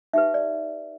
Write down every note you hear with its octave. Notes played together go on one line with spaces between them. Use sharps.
D#4 G4 B4 E5
D5